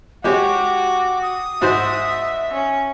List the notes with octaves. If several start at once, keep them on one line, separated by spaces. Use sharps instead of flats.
G#3 F#4 G4 C#5 D6
D#6
G#2 F#4 C5 E5
C#4